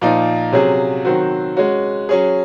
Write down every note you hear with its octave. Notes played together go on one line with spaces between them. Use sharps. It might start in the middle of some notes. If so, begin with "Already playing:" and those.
A#2 F3 A#3 D#4
C3 F#3 C#4 G#4
D#3 F#3 C4 F#4
G#3 C#4 F#4
F#3 C#4 G#4